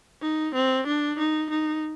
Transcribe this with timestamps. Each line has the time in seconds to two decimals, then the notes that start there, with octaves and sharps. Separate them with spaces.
0.22 D#4
0.55 C4
0.87 D4
1.19 D#4
1.50 D#4